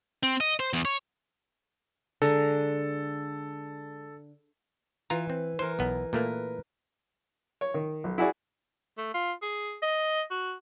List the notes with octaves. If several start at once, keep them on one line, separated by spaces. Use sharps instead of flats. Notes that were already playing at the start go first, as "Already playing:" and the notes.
C4
D#5
C5
E2
C#5
D3 G#3 A4 A#5
E3 F4 A#5
C4
E3 A#4 C5
B1 B3
A#2 A3 A#3 A#4 B4
C#5
D#3
B1
E4 F#4 G#4 D5
A3
F4
G#4
D#5
F#4